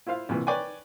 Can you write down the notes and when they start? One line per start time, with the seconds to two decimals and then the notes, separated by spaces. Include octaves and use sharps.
0.07 E4 F4 C5 F5
0.29 C2 A#2 E3
0.47 B4 C#5 D5 G5 G#5